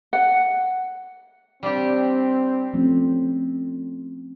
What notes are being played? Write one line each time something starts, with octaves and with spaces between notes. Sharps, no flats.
F#5
G3 C4 D4 G4
F3 A3 C4 C#4